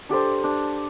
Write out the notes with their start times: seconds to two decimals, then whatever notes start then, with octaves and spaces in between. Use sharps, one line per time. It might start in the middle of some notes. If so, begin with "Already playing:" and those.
0.09 D4 G4 A4 C5
0.44 D4